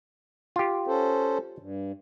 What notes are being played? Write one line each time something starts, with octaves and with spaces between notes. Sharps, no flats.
F4 G4
C#4 A4 C5
G2